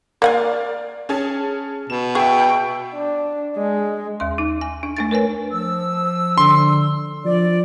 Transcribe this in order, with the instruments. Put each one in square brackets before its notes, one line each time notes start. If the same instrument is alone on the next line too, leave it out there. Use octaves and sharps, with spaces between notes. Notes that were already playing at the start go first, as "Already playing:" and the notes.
[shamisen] A#3 F#5 G#5 [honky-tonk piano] D5 F5
[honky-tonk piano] C#4 G#4 A5
[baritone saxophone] B2 [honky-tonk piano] E7
[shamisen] G#4 [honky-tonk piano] E5 C#6 [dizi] G5
[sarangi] D4
G#3
[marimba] D#2 C6
D#4
G#5
D4
A3 D4 A6
A#4 B4 C#5 G#5
[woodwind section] F3 E6
[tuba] D3 [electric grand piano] C6
[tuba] F3 [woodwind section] D5